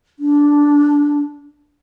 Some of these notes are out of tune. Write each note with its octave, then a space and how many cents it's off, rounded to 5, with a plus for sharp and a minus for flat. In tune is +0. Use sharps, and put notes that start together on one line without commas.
D4 -10